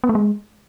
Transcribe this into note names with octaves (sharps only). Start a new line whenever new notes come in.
B3
A3
G#3